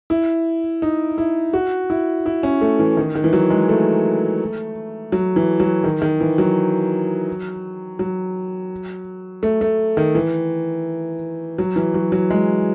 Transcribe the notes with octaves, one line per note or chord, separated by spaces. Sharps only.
E4
D#4
E4
F#4
E4
E4
C#4
A3
E3
D#3
D#3
E3
F#3
G#3
A3
F#3
E3
F#3
D#3
D#3
E3
F#3
F#3
A3
A3
D#3
E3
F#3
E3
F#3
F#3
G#3